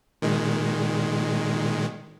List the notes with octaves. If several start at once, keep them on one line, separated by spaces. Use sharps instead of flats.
A#2 D#3 G#3